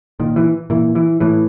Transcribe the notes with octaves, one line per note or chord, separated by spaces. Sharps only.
A#2 D#3
E3
A#2 E3
E3
A2 E3